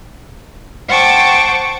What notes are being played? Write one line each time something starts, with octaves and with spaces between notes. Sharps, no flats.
C5 F#5 G5 A5 C#6 D6